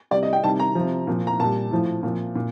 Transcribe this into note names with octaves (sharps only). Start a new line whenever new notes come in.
C3 G3 D5
D#5
G5
C3 D#3 G3 A5
A#5
C3 F3
A#2 F3
A#5
A#2 G3 A5
A2 F3
A#2 F3
A#2